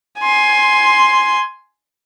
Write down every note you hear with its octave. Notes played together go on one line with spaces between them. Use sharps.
G#5 C6